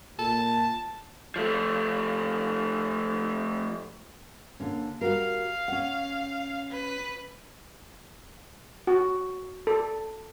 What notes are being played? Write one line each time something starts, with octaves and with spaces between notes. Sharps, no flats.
A#2 A5
F3 A3
D3 A#3 C#4
G3 F#4 A#4 F5
C#4 F#5
B4
F#4
A4